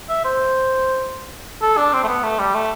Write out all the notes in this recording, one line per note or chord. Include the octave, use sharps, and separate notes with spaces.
E5
C5
A4
D4
C4
A3
B3
A3
G3
A3